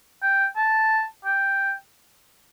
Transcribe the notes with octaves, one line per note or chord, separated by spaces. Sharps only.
G5
A5
G5